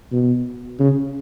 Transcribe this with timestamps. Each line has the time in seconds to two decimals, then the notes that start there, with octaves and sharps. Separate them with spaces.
0.12 B2
0.79 C#3